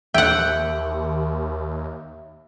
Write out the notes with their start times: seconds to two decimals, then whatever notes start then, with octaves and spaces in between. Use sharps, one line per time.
0.14 D#2 E5 F#5 G5